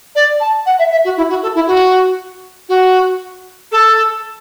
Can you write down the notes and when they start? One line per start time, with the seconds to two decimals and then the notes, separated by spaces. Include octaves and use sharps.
0.15 D5
0.40 A5
0.65 F#5
0.78 E5
0.91 E5
1.04 F#4
1.17 E4
1.29 F#4
1.42 A4
1.55 E4
1.67 F#4
2.69 F#4
3.71 A4